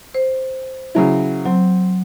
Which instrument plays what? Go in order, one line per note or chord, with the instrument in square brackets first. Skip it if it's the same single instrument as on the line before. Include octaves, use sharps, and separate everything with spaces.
[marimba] C5
[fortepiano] C#3 F#3 E4
[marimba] F#3 [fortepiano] C4